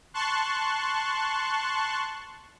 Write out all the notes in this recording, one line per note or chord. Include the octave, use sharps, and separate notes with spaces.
A5 C6 C#6 F#6